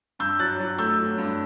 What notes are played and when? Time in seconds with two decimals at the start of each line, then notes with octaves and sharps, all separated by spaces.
0.19 G2 E6 G6
0.39 F#3 F#6 A6
0.60 F#3
0.78 A3 E6 G6
0.98 F#3
1.18 G2